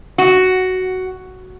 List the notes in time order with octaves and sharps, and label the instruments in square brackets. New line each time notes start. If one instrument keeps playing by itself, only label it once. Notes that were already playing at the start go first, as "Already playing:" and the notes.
[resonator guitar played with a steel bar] F#4